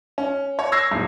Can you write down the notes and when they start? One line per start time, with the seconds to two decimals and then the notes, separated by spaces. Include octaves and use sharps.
0.18 C#4
0.59 C#5
0.72 C#6 E6 G#6 A#6 C7
0.91 D1 A#2